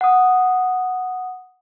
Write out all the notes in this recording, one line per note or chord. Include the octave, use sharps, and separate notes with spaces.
F#5 D#6